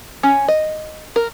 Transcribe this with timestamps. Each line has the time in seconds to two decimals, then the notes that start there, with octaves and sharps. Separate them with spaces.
0.23 C#4
0.48 D#5
1.16 A#4